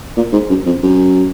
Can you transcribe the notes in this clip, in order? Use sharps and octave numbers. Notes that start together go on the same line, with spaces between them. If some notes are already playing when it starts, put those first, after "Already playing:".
A#2
G#2
F#2
F2
F#2